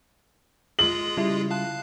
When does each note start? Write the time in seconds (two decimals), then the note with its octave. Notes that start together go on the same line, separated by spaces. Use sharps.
0.79 G#3 F4 G#4 F#7
1.17 C#3 G3 E4
1.51 F5 A5 F#6